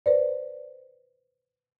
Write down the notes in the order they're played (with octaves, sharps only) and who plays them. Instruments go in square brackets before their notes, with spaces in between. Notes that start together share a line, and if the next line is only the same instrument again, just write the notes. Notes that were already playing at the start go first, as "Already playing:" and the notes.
[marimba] B4 C5 D5